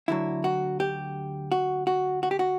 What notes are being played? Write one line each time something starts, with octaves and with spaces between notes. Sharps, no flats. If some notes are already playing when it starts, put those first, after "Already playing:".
D2 D3 F#3 E4
F#4
G4
F#4
F#4
F#4
G4
F#4